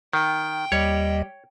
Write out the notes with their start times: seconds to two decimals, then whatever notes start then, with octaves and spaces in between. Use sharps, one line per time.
0.13 D#3 G5
0.72 D#2 G3 C#5 D#5